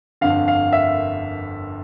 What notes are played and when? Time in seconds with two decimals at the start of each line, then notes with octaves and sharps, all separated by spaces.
0.21 G1 F2 D3 F5
0.48 F5
0.73 E5